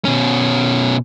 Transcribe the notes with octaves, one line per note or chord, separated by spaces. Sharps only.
B2 C#4